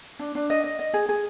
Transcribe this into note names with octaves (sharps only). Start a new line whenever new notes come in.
D4
D4
D#5
D#5
D#5
G#4
G#4